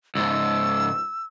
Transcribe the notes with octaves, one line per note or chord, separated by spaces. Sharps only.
C#2 G#2 E6